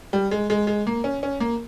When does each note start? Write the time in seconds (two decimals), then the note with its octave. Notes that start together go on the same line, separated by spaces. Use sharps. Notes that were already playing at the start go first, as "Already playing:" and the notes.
0.13 G3
0.31 G#3
0.50 G#3
0.67 G#3
0.87 A#3
1.04 C#4
1.23 C#4
1.40 A#3